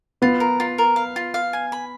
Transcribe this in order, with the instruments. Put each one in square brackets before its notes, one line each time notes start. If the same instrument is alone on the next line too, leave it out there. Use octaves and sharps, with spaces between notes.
[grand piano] B3 [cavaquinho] F4
[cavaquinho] A#4
F4
A#4
F5
F4
F5
G#5
B5